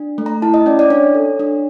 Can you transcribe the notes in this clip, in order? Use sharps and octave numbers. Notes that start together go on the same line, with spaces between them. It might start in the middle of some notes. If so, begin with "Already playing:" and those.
Already playing: D4
A3
A#5
E4 A5
D#5
C#4 D5
D5
D4 C#5
A4
D4